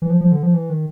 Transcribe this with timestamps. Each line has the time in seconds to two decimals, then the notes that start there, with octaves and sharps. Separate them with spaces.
0.02 E3
0.10 F3
0.21 F3
0.32 D3
0.43 F3
0.54 E3
0.70 D#3